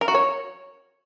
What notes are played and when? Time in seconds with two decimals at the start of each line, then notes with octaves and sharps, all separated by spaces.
0.01 A#4
0.08 F#4
0.15 C#5